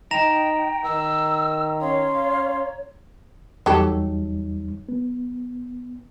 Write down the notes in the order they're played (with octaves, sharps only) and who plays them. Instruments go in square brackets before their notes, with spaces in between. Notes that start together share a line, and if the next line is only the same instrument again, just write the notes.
[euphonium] D#4 [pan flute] G5 [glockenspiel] A#5 A#6 F7
[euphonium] D#3 [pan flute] E6
[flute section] C#4 F5 C6 [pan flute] C#5
[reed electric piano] E2 G3 D#4 [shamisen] F#3 G4 A4
[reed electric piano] B3